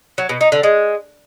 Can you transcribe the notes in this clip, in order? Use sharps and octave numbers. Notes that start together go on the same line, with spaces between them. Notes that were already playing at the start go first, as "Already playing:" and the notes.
F#3
B2
D#4
D3
G#3